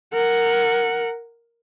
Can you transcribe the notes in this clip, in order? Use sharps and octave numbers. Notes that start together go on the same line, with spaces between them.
A#4 F#5